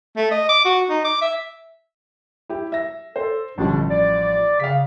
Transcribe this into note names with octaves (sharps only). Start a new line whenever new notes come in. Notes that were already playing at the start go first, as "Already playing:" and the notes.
A3
D#5
D6
F#4
D#4
D6
E5
E4 G4
E5 A#6
A4 C5
A1 B2 D3 F3 G3 D4
D5
C#3 F5 B6